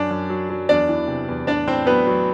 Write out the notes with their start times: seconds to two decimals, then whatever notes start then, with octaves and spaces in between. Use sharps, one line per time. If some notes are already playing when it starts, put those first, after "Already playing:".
Already playing: F#2 D4 D5
0.11 F#2
0.30 F#3
0.49 F#3
0.69 E2 D4 D5
0.89 E3
1.08 C3
1.28 E2
1.47 A2 D4 D5
1.67 A2 C4 C5
1.87 F#3 B3 B4
2.07 F#3